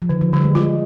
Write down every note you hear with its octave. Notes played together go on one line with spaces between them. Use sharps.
F3
D3 D#3
F3
D3 G3
G#3
G#3 F4